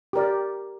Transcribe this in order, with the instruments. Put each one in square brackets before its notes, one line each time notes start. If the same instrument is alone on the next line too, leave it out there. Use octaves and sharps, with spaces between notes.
[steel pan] G4 A#4 D5